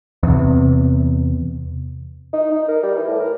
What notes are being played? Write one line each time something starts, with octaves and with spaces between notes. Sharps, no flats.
E2 C3
D#4
D#4
A#4
G3
E3
A2
A#4